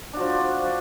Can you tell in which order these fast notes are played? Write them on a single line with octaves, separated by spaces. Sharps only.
D4 F#4 F3